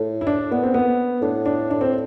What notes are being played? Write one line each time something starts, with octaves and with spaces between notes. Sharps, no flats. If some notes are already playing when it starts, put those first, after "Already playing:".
Already playing: A2
E4
D4
B3
C4
B3
A2 D4
D4
D4
C4